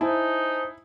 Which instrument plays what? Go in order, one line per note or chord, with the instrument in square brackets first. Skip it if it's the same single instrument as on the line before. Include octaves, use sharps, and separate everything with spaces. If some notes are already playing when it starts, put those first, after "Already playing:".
[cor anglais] D#4 [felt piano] E4 [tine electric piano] C5 G#5 A5